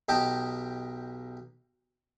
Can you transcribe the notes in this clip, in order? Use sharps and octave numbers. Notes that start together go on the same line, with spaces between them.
B1 G4 D#5 G5 A5